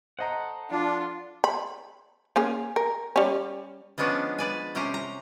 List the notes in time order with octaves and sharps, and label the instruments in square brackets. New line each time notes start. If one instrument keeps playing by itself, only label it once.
[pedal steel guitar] A4 F#5 [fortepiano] C5 D#5 A#5
[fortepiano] F3 [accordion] D4 [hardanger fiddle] F4
[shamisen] B5
A#3 C#4 G#4
A#4
G3 C#4
[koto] F3 G#3 B3 C#4 D4
B4 D5 G#5
C3 C#4 G4 C5 A#5
A#5